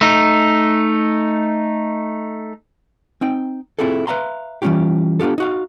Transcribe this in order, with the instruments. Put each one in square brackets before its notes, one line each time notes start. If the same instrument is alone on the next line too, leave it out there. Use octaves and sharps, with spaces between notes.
[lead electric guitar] A3 D#4
[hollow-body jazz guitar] C4 D#4 G5
C4 E4 F4 G#4 A4
B4 E5 F5 A#5 C6
E3 G3 A3 C#4 F4 G4
B3 D4 F4 G4 A4
D#4 F#4 F5